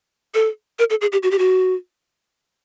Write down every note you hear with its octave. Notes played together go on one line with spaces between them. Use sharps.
A4
A#4
A4
G#4
G4
F#4
G4
F#4